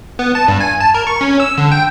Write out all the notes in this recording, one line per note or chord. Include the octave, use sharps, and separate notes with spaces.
B3
A5
G2
G#5
A5
A#4
C#6
C#4
E6
D3
G5